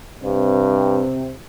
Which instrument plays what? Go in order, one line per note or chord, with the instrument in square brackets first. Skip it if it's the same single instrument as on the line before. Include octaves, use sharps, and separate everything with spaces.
[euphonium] G2 [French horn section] C3 C4